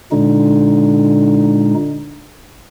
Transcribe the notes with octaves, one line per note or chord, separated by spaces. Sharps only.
A#2 D3 G#3 D#4